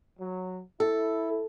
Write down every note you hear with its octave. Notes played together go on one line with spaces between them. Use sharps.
F#3
E4 A4